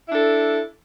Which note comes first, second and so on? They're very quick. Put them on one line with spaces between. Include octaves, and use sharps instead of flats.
E4 D4 A4